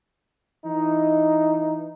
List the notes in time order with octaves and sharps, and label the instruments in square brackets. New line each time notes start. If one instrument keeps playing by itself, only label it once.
[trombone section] E3 D#4